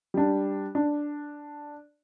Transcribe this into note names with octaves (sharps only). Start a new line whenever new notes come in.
G3 D4
D4